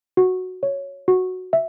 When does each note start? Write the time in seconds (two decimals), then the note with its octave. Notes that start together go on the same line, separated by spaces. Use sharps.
0.17 F#4
0.63 C#5
1.08 F#4
1.53 E5